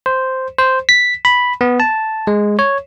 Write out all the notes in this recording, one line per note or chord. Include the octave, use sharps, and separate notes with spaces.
C5
C5
B6
B5
B3
A5
G#3
C#5